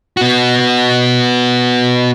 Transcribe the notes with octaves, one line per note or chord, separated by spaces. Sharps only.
B3 F#4